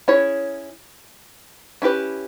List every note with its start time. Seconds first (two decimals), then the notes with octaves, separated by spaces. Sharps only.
0.08 C#4 E4 G#4 C#5
1.82 C#4 E4 G4 B4